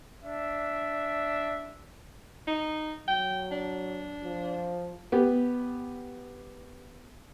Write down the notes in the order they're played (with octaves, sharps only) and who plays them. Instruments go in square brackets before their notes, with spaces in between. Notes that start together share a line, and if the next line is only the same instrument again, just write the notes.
[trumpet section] D4 E5
[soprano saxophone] D#4
[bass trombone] F#3 [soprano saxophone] G5
[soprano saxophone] D4
[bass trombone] F3
[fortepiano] B3 G4